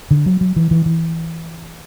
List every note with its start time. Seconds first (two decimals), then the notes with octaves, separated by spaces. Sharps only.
0.11 D3
0.26 F#3
0.41 F#3
0.56 E3
0.71 E3
0.86 E3